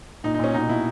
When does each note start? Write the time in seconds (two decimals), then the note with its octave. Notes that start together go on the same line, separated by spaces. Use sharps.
0.24 A#2 D#4
0.34 D#4
0.39 A#2 C#4
0.54 B2 D#4
0.69 B2 E4